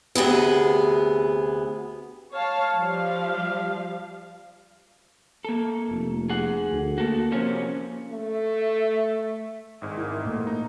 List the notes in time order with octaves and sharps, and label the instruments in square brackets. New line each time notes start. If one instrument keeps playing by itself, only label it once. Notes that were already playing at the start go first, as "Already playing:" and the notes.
[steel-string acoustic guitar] D2 C3 B3 G#4
[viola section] C#5 F5 A5
F3 G3 F5
[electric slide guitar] A#3 A4
[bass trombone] F1
[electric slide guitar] G#4 F#5
[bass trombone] D2
[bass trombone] A#3 [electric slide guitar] F#4 A4
[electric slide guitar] C3 F3 C#4
[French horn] A3
[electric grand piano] G#1 G#2
[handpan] E4 [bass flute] A#4
[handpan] A#2 [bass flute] A3
[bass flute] A#3 [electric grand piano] D#4